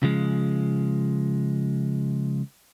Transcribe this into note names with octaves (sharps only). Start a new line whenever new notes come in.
C#3 F3 G#3